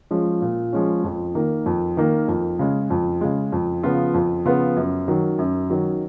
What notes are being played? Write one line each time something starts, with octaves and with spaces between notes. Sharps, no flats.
F3 G#3 C#4
A#2
F3 G#3 C#4
F2
D#3 A#3
F2
D#3 A#3
F2
C#3 G#3
F2
C#3 G#3
F2
C#3 F3 B3 F4
F2
C#3 F3 B3 F4
F#2
D#3 F#3
F#2
D#3 F#3